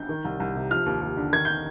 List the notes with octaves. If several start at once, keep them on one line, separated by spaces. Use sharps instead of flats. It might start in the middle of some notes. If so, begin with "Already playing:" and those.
Already playing: G6
D#3
C2
C2
C3
F3 F6
D#2
D#2
D3
D#3 G#6
G6